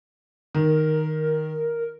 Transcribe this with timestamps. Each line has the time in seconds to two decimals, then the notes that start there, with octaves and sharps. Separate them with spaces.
0.55 D#3 A#4